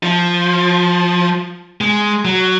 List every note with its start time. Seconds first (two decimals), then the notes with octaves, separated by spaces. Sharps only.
0.03 F3
1.81 G#3
2.25 F#3